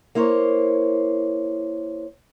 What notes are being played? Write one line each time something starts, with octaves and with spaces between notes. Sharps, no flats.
A#3 E4 C5 C#5